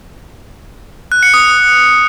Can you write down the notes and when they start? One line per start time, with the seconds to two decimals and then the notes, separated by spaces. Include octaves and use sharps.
1.12 F#6
1.23 C#7
1.34 D#6